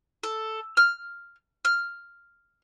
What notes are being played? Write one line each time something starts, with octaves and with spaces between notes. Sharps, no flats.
A4
F6
F6